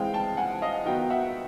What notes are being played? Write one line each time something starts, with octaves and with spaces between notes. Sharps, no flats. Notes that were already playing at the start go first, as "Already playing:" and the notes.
Already playing: E3 G#3 C4 F5 G5
G5 A5
F#5 G#5
D#5 F5
D#3 F#3 B3 D#4 F5 G5
E5 F#5